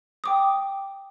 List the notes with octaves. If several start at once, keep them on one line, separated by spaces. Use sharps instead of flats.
G5 D6 D#6